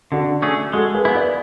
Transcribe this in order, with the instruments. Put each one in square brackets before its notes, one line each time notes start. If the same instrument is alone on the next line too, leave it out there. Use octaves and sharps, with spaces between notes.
[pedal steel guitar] D3 [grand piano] D4 F#4
[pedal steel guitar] A3 C#4 G#4
[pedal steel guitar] G#3 [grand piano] F#4 A4
[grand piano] G#4 B4
[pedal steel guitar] B3 E4
[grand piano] B4 D5